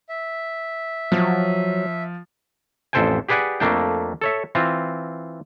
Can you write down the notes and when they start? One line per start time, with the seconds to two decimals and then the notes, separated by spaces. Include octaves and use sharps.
0.09 E5
1.12 F3 F#3
2.93 A1 F2 A4 C5 G5 G#5
3.29 G4 G#4 B4 D5 F#5 G#5
3.60 F2 A3 A#3 D4 G5
4.21 A4 C#5 E5
4.55 E3 C4 F4